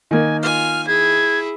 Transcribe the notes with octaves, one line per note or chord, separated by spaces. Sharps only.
D#3 A#3 G#5
F4 G#5 F6
E4 G#4 G#6